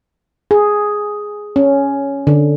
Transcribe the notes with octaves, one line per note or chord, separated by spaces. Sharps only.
G#4
C#4
D3